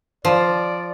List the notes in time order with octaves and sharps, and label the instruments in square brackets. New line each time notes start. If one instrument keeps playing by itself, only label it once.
[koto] F3 [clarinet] D5